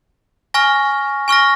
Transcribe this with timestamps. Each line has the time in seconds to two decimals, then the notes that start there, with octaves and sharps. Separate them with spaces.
0.54 G#5 C#6 F6 A#6
1.28 G#5 C#6 F6 A#6